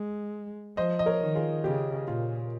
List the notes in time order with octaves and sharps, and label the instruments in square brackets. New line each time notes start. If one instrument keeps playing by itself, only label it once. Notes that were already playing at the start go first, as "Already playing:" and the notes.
Already playing: [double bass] G#3
[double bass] F3 [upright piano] C5 D#5
[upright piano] D#5
A#4 C#5
[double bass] D#3
[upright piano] F4 G#4
[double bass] C#3 [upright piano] G4
[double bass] A#2 [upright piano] F4